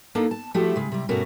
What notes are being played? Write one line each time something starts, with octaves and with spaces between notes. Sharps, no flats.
A#3 D4 D#4 A4
A5
F3 A3 E4 F#4 G4
C#3 G#3
C3 G3
G2 B2 A3 C#4 F#4 A#4